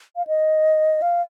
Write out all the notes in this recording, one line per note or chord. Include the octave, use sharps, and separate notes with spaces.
F5
D#5
F5